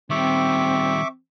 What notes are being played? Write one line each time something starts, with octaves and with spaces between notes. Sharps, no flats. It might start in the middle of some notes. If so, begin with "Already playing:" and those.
D#3 G3 C4 E5 C#6 D6